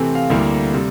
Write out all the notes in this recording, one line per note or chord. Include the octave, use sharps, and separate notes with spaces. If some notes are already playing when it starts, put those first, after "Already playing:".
Already playing: C3 E3 A3 C4
F5
D2 D3 G3 A#3 E4
C3 G3